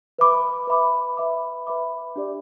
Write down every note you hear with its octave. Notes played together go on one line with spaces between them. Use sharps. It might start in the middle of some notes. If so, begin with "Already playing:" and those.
B4 E5 B5 D6
B4 E5 B5 D6
B4 E5 B5 D6
B4 E5 B5 D6
D4 G4 D5